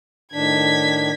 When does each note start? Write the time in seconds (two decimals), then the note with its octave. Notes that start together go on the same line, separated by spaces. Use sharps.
0.33 A2 D#3 D4 G#6 B6